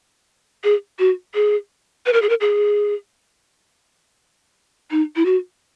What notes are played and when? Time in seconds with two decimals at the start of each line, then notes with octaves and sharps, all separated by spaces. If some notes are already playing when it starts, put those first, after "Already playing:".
0.64 G#4
0.99 F#4
1.34 G#4
2.06 B4
2.13 A#4
2.22 G#4
2.29 A#4
2.41 G#4
4.91 D#4
5.16 E4
5.25 F#4